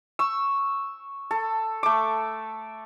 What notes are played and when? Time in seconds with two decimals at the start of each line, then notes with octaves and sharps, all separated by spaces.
0.19 C#6 E6
1.31 A4
1.83 A3 D6